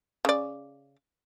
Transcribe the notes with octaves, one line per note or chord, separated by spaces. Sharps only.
C#3 D5